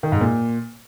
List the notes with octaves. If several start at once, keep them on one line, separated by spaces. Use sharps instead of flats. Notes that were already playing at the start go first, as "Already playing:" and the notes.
D#3
G#2
A#2